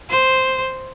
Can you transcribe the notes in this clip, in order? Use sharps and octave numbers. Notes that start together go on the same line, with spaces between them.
C5